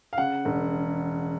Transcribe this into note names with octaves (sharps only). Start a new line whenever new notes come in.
F5
C#3 F#5
E1